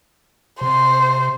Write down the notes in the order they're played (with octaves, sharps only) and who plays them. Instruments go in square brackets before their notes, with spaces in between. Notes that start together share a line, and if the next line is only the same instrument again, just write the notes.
[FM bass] C3 [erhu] C5